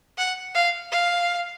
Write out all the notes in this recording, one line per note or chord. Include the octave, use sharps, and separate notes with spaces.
F#5
F5
F5